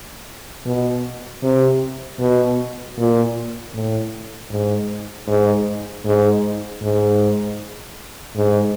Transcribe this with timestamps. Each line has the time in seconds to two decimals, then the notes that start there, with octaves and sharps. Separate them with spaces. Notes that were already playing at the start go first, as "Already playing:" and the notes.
0.65 B2
1.43 C3
2.20 B2
2.97 A#2
3.73 A2
4.51 G#2
5.27 G#2
6.05 G#2
6.82 G#2
8.36 G#2